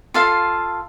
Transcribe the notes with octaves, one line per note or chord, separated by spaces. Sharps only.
F4 A4 F5